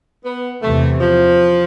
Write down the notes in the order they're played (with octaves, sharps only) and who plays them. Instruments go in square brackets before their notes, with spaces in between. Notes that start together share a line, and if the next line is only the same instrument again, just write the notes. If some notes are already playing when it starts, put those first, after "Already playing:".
[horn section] B3
[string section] E2 C3 E3 [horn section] A3
[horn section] F3